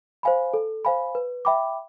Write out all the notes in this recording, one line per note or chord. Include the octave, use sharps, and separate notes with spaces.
C5 F5 G#5 B5
A4
C5 F5 G#5 B5
B4
E5 G5 B5 D6